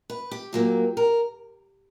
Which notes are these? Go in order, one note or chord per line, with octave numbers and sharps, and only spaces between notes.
B4
G4
A#2 F#3 A#3
A#4